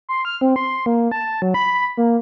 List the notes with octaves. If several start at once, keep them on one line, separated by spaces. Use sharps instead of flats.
C6
F6
C4
C6
A#3
A5
F#3
B5
A#3